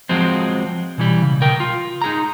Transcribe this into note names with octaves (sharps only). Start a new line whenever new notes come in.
F3 F#3 G#3 C4
B2 E3 G3
C#3
B1 A#4 G5
F4
D#4 G#4 A#5